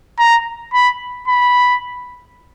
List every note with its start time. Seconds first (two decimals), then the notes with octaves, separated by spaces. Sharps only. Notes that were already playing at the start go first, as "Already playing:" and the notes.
0.19 A#5
0.74 B5
1.28 B5